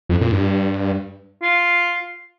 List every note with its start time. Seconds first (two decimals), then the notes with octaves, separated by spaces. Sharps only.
0.09 F2
0.21 A#2
0.32 G2
1.42 F4